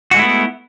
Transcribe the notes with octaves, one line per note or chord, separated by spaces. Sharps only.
G#3 A3 B3 E4 F#4